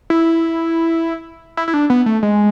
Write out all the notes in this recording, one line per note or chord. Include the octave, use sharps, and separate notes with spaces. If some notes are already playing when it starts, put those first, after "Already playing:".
E4
E4
E4
D4
B3
A3
G#3